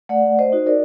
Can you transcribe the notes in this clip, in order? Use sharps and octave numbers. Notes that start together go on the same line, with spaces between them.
A3 D5 F#5
C5 D#5
D#4 F#4
A#4 D5